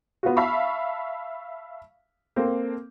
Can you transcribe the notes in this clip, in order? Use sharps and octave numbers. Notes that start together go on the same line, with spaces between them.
B3 F4 F#4
E5 F5 A5 B5 C#6
A#3 C4 A4